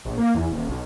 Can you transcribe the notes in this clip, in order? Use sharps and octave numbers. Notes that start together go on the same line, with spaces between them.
A#1
A#3
E2
D#1
B1